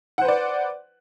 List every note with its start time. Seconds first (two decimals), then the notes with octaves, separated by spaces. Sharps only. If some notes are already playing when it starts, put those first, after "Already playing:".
0.18 F#5
0.21 C5
0.25 B4
0.28 D5